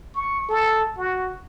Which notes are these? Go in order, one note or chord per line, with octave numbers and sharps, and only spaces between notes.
C#6
A4
F#4